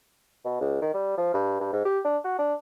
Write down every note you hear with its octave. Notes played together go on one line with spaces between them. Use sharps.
B2
C#2
D#3
G3
F3
G2
G2
G#2
G4
D4
F#4
D4